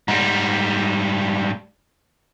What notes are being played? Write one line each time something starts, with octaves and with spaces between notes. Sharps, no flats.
G#2 G3